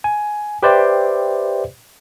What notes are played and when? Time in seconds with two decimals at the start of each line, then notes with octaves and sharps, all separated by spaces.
0.04 G#5
0.63 G4 B4 C5 D5 E5 G5